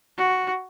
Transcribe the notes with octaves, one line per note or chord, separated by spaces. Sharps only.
F#4